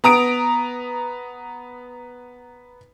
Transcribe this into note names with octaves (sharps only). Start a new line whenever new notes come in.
B3 A#5 D#6 D7